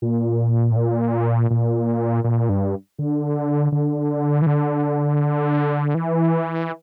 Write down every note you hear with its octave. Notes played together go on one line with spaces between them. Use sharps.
A#2
A2
A#2
A#2
A#2
G2
D3
D3
E3
D3
E3